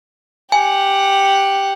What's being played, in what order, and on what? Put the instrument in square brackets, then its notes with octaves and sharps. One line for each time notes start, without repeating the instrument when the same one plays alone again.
[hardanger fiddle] G4 F#5 [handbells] G#5